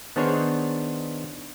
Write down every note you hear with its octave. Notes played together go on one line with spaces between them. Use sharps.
D#3 B3 D4 G#4 C5 C#5